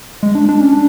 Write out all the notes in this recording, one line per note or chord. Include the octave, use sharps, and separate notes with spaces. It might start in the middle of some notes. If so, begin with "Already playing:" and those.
G#3
D4
D4
C#4
D4